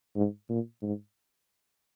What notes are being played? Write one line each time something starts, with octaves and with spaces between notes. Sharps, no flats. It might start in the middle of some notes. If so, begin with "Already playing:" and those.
G#2
A#2
G#2